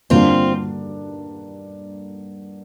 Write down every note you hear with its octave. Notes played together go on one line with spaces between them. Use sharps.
G2 D3 A#3 C4 D4 F4